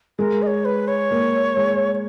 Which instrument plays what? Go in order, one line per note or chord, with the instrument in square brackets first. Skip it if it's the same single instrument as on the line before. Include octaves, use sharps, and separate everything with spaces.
[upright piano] G#3 [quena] A#4
[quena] D#5
C#5
B4
C#5
[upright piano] A#3
G#3